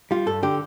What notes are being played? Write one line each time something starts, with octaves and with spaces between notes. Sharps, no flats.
G3 F4
G2 A4
D3 G4